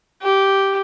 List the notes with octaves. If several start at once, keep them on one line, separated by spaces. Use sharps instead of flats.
G4